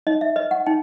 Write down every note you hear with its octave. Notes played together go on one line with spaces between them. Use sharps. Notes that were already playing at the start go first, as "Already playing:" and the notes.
D#4 D#5
E5
B4 D#5
F#5
D#4 G5